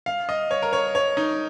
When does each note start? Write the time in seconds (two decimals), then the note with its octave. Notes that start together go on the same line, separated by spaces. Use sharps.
0.06 F5
0.29 D#5
0.51 C#5
0.62 A#4
0.73 C#5
0.95 C#5
1.17 D#4